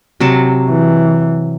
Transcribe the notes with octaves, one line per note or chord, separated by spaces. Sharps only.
C3 F#3 A5
E3